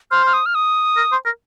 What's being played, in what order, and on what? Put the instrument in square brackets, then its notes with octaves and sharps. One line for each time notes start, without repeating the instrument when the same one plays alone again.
[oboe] C5 [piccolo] F6
[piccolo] F6
D#6
F6
D#6
[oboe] A#4
C5
A#4